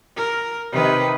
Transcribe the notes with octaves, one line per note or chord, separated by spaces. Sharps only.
A#4
C3 D#3 B4